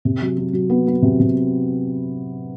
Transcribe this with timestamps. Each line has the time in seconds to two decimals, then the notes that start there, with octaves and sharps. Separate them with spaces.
0.05 C3
0.22 F#3
0.38 F#3
0.53 F#3
0.70 B3
0.87 B3
1.02 C3
1.20 C3